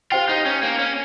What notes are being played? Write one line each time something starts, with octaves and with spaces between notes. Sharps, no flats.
F4 G4 C5 G5
D#4
C#4
A#3
C#4